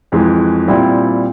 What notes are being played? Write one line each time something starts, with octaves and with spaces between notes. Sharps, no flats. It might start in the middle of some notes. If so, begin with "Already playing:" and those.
F2 E3 G#3
A#2 G3 C4 E4